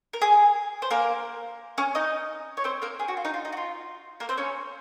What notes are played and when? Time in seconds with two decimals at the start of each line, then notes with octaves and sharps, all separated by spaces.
0.13 A#4
0.22 G#4
0.82 C5
0.91 A#3 A#4
1.78 C#4 C#5
1.95 D#4 D#5
2.57 C#5
2.64 C4 C5
2.82 A#3 A#4
3.00 G#4
3.08 F#4
3.17 F4
3.25 D#4
3.34 F4
3.45 D#4
3.52 F#4
3.57 F4
4.20 A#3 A#4
4.29 C4 C5
4.37 C#4 C#5